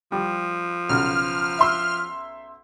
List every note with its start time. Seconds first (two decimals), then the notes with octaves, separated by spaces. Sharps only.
0.12 F3 G3
0.89 B1 C#3 F6
1.59 E5 C6 E6